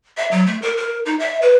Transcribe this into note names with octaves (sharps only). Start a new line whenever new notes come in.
E5
F#3
A3
A#4
A#4
D#4
E5
B4